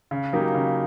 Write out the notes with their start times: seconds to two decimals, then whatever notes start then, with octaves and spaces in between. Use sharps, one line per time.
0.11 C#3
0.33 F#3 A#3 D#4 G4
0.55 C#3